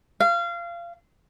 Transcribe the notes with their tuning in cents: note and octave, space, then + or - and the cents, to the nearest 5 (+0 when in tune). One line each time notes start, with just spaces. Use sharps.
F5 -25